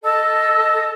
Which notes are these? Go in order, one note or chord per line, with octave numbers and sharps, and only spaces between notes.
A4 D#5 A5 E6